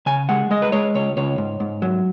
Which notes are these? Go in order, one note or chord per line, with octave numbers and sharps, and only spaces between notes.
C#3 G#5
G#3 F#5
G#3 D#5
B4
G#3 C#5
C#2 C#5
C#2 C#5
G#2
G#2
F#3